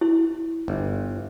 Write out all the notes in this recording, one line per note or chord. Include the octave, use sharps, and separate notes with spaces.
E4
G1